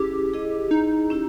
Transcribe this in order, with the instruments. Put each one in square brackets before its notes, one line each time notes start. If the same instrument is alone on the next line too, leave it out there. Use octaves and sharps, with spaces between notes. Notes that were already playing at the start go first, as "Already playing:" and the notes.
Already playing: [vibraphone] C#4 E4 G#4 [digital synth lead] G4
[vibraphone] E4 G#4 D#5
[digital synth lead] D#4
[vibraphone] C#4 E4 G4